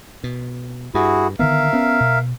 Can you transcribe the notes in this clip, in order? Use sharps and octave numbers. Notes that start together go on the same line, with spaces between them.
B2
G2 E4 F#4 G#4
D3 D#3 B3 A#4 E5 F5
B3 C#4
B2